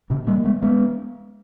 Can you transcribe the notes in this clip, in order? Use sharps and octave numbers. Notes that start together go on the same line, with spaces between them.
A#2 C#3
G3 A#3
G#3 B3
G#3 B3